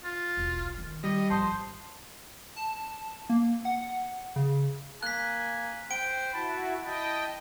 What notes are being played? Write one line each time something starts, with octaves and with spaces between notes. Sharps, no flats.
F4
E1 B1
D#3
G3 D#5
G#1 F3 C5 A5 C6 D#6
A5
A#3
F#5
C#3
A#3 G#5 F#6 B6
C5 G5 D7
E4 F#4 A5 B5
E4 D#5 G5 A5